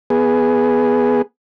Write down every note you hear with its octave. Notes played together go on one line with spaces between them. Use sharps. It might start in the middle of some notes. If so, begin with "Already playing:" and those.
B3 G#4